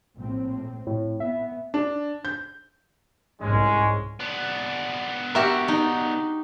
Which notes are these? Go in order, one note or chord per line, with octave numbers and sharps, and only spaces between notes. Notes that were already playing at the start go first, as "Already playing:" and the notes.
A#1 A2 C4
A2
B3 E5
D4
G6
C2 G#2 G#3 C#4
B3 D4
F#4 G4 A#4 E5
D#4